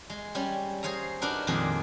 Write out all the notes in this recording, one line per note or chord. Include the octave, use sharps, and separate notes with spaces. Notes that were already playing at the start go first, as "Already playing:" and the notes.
G#3
G3 C#4 C#5
G#4 C5 C#5 F5 A#5
D4 D#4 F#4 A#4 B4
F2 A#2 D#3 G#3 G#4